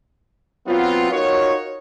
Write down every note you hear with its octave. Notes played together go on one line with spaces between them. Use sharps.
F#3 B3 C4 F4
D#4 F4 F#4 A#4 C#5